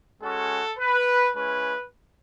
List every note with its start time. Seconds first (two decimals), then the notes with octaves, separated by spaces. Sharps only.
0.22 G#3 C#4 F#4 A4
0.78 B4
1.34 G#3 C#4 E4 B4